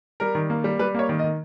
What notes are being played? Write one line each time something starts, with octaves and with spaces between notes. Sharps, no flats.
G3 A#4
D#3
A#3
G3
G3 B4
A#3 C#5
D#3
D#5
D#3